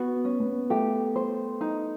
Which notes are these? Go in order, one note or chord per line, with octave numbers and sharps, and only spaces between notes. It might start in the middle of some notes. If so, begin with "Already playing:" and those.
Already playing: B3 F#4
C#4
B3
A3 G4
C5
D#4